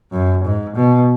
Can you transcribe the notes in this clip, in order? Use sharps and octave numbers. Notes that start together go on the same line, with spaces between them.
F#2
G#2
B2